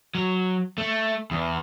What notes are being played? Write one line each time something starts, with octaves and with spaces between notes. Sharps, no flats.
F#3
A3
E2